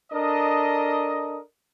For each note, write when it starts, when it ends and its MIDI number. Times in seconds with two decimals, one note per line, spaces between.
0.12 1.38 62
0.12 1.38 69
0.12 1.38 70
0.12 1.38 75